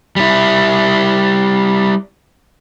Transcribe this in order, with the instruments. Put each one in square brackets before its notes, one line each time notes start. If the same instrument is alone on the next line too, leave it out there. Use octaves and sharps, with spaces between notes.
[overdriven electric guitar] G3 E4